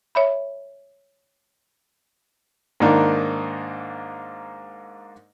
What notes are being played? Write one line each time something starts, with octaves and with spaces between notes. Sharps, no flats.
C#5 E5 B5
G#2 D#3 A#3 D4 D#4